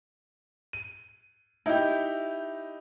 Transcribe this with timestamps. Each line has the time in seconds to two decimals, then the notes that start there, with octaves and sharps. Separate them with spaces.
0.73 D#7
1.66 D#4 E4 G4